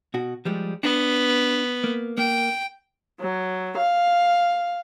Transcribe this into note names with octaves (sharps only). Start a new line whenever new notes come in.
B2 F#4
F3 G3 G#3
B3 D4
A#3
A#3 G5
F#3
F5